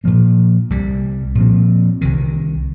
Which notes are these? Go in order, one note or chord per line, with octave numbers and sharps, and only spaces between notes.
A#2 F3 A#3
C2 C3 G3
A#2 F3 C4
C2 C3 D#3